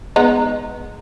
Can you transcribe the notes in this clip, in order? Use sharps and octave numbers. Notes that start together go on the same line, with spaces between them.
G#3 B3 D#4